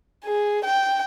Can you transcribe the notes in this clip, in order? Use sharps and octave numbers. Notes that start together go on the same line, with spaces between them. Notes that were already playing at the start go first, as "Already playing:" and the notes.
G#4
G5